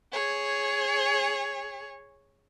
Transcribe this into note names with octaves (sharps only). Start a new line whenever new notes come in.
G#4 C#5